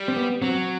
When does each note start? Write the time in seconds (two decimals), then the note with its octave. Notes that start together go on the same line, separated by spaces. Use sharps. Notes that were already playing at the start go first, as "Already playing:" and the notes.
Already playing: G3
0.08 C4
0.17 B3
0.42 F#3 C4